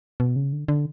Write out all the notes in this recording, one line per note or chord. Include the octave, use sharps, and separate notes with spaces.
B2
C#3
D3
D3